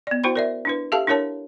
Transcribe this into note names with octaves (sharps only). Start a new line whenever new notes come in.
B3 D5
E4 F#4 C5 G5 B5
A#4 D5 E5
D4 E4 B4
G4 A4 E5 F5 A5
D4 E4 A#4 C#5 A5